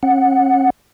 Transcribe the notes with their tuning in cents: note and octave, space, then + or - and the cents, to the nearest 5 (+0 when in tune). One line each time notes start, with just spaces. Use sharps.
C#4 -35 F#5 +0